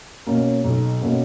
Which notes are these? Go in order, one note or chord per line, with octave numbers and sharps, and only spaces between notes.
B2 A#3 C#4
B1
B2 A#3 C#4